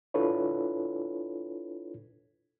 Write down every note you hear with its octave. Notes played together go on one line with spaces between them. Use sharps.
D4 E4 F4 A4 B4 C#5